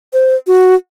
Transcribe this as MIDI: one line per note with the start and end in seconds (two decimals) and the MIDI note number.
0.13 0.36 72
0.47 0.75 66